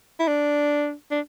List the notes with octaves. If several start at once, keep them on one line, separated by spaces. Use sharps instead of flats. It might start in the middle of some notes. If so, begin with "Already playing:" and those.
E4
D4
D4